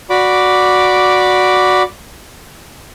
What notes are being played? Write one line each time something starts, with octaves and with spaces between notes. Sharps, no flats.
F#4 D5 B5 D6